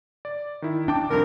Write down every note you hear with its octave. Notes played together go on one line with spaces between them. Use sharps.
D5
D#3 E4
D4 G5 A5 D6
C2 F2 A#4